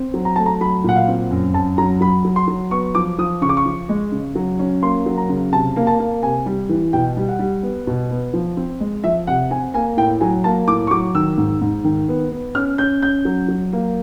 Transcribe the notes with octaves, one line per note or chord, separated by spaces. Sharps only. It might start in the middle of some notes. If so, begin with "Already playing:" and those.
Already playing: C4
F#3
A#5
A3 A5
A#5
F#3 B5
A#2 F#5
F5
C4
F#2
F#2 A5
F#3 A#5
F#3 B5
F#3
C6
F#3
B3 C#6
F3 D6
F3 D#6
C#3 C#6
D6
C#6
F3
G#3
C#3
F#3
C#4
A#3 C6
F#3
A#5
C#3
C3 A5
A#3
A5
A#3
C3 G#5
G3
E3
B2 G5
G3
F#5
G3
B3
B2
B3
F3
C4
G#3
F3 E5
C3 F#5
C4 G#5
A#3 G#5
A2 G5
F#3 G#5
A#3 A5
A2 D6
C#6
F#3 D6
D#3 E6
G#2
G#2
D#3
B3
B3
C#4 F6
C#4 G6
C#4 G6
F#3
F#3
A#3